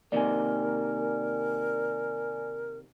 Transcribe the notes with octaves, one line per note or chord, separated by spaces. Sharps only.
C3 D#3 A#3 A#4 D5 G#5